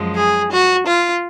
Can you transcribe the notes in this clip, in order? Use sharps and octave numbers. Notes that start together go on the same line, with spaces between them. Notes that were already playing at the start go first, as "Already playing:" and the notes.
Already playing: F#2 F3 G#3
G#4
F#4
F4